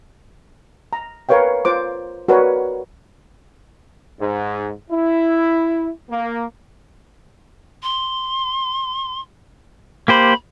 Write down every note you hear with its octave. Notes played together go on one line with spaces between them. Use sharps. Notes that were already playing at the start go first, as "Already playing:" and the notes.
A#5
A#4 B4 C#5 F5 G5
F4 C5 D6
F#4 A#4 B4 C#5 D5
G#2
E4
A#3
C6
A#3 G4 C5 B5